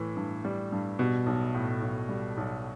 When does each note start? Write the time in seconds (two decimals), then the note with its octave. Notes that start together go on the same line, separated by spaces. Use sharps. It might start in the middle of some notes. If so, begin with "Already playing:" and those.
Already playing: A2 E3
0.17 G2
0.45 G3
0.72 G2
0.99 B2 G3
1.26 B1
1.55 A2
1.82 B1
2.09 G3
2.37 B1